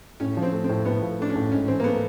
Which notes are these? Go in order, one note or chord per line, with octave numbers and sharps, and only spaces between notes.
A2 C#4
F3
C4
A3
C4
A2
A2 B3
F3
A3 D4
C#4
A2
G#2 C#4
E3 C4
A#3
A3 B3